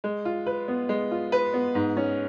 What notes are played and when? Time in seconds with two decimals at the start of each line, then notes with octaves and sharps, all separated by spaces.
0.04 G#3
0.25 F4
0.46 B4
0.68 B3
0.89 G#3
1.11 F4
1.32 B4
1.54 B3
1.75 G#2
1.97 C#4